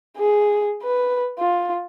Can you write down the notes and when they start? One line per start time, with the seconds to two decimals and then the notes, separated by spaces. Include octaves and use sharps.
0.18 G#4
0.83 B4
1.39 F4